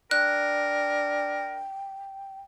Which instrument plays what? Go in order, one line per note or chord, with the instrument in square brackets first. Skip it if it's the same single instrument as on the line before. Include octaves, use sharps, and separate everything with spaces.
[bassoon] D4 [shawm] A#4 [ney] G5 [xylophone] F#6